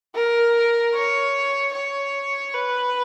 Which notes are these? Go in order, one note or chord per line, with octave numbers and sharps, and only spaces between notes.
A#4
C#5
C#5
B4